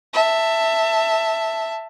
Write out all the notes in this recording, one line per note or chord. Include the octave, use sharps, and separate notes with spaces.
E5 A5